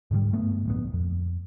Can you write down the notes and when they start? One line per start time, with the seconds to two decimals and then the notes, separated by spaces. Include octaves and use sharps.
0.11 G#2 D3 D#3 G3
0.32 G2 A3 B3
0.66 D1 A#1 B3
0.93 F2